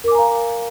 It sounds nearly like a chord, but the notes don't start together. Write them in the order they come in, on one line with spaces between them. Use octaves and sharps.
A#4 D6 G#5 A#5 F5